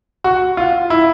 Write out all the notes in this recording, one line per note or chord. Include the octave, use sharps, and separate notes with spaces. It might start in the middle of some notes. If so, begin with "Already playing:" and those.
F#4
F4
E4